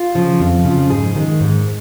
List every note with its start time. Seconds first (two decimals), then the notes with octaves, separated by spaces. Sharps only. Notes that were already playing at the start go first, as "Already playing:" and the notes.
Already playing: F4
0.15 C#3 F3
0.40 F2
0.65 C#3 F3
0.90 G#2 G#4
1.15 D#3 G#3
1.40 G#2